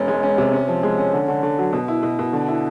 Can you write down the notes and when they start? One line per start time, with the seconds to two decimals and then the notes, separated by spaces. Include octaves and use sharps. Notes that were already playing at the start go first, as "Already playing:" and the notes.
Already playing: E1 C#4
0.08 G#3
0.23 C#4
0.38 C3
0.53 C#4
0.68 F3
0.83 G#3
0.98 C#4
1.13 D3
1.28 D3
1.43 D3
1.59 F#3
1.73 B2
1.88 E4
2.03 B2
2.19 B2
2.33 D3
2.48 E4